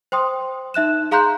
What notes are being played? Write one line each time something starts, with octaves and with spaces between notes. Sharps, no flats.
C5 G5 C6 D#6
D#4 E5 F#6 E7
G#4 F5 A#5 C6 F#6 G6